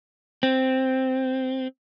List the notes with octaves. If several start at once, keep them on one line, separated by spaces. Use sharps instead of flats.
C4